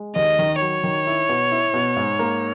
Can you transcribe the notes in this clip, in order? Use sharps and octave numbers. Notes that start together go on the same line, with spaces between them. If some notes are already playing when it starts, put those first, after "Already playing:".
Already playing: G#3
D#2 D#5
D#3
F#3 C#5
D#3
E4
B2
E4
B2
G#2
A#3